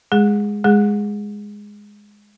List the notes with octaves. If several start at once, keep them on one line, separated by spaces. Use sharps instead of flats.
G#3 G#4
G#3 G#4